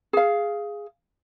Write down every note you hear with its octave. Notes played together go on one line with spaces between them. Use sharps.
G#4 F5